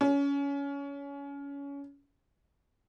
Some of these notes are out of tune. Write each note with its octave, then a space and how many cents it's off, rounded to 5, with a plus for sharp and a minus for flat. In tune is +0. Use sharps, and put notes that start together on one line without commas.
C#4 +25